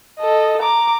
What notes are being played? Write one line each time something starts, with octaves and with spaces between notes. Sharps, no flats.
A4 D#5
A#5 D6